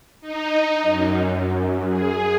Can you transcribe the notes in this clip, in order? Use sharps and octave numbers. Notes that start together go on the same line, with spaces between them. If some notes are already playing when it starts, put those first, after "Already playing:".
D#4
F#2
G#4